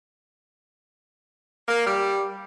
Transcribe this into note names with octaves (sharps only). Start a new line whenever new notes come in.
A#3
G3